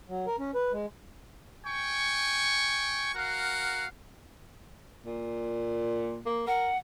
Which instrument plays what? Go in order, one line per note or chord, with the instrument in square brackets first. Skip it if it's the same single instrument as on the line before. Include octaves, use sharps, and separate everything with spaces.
[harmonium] F#3
A#4
C#4
B4
G#3
[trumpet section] G5 G#5 C#6
F#4 A#4 F5 F#5
[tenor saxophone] A#2
A#3
[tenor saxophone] A#4 [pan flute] F#5